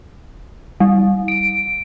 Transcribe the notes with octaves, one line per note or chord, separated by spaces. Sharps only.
G3
D7